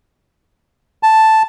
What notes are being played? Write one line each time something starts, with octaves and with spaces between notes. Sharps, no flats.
A5